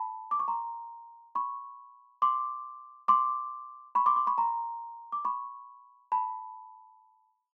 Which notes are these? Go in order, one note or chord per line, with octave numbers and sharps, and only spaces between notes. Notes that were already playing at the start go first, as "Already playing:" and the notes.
Already playing: A5 B5
D6
C#6
A#5 C6
B5 C#6
C6 D6
C6 D6
B5 C#6
C6 D6
C6 D6
B5 C#6
A#5 C6
D6
B5 C#6
A5 B5